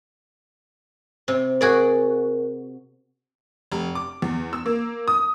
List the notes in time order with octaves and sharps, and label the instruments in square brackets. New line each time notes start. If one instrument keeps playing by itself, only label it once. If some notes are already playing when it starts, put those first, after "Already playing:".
[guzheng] C3
[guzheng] F#4 G#4 D5 [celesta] A#4
[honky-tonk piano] F1
D6
E2
E6
A#3
D#6